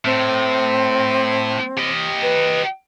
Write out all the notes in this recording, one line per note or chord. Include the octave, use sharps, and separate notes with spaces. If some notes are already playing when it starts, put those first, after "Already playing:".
A2 C4
G4 D#5
B4